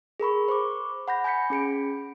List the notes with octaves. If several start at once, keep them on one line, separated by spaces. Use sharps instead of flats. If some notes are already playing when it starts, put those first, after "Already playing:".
G#4 A#4 B5 C#6
C5 C#6 D6
F#5 B5 G6 A#6
G#5 B5 G6 B6 C#7
C#4 G#4 C#7 D7